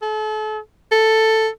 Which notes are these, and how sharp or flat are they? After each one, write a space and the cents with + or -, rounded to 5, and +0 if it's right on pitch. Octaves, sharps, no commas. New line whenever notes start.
A4 -35
A4 +5